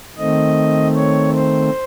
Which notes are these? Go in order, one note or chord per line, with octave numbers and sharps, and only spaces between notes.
D#3 A3 C4 D#5
C#5
C5